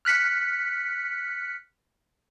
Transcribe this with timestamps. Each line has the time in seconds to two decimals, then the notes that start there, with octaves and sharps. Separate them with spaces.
0.05 F6 F#6 B6 C#7